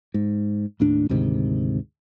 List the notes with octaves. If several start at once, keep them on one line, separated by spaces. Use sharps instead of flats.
G#2
D#2 A2 D4
D2 G#2 C3 D#3